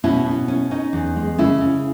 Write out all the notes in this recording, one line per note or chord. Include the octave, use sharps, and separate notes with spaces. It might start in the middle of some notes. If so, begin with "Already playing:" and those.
B2 C#4 E4
B2
C#4
C#4 D#4
E2
G#3
C#3 C#4 E4
C#3